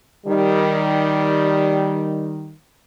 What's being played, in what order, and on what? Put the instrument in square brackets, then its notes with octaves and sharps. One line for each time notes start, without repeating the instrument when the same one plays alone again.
[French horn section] D#3 G3